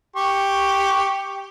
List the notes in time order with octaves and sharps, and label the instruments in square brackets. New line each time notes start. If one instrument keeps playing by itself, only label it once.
[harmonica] G4 C#6